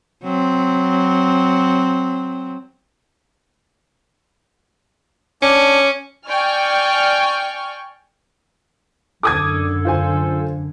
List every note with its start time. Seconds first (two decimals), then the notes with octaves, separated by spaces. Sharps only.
0.23 F#3 C4
5.42 C#4 D4
6.28 D5 G5 G#5 C#6 F6
9.23 F#2 D3 A4 D6 D#6 G#6
9.85 F4 C5 G#5